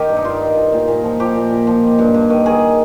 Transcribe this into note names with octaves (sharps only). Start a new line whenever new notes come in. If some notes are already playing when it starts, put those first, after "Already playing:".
Already playing: D#3 G4 A#4
G2
D#4
G2 F4
D#3
F3
A#2
A#2
F3
F3 G4
A#2
A#2
F3
D#3
G2
G2
D#3
D#3 G#4